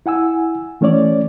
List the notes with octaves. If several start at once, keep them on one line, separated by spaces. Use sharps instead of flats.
E4 F#5 G#5 E6
E3 A3 C#4 C#5 D5